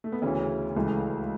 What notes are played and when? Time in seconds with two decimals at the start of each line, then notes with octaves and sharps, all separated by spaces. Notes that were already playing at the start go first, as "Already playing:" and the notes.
0.04 A3
0.12 B3
0.22 D2 C#3 E3 C#4
0.76 C#2 C#3 E3 A3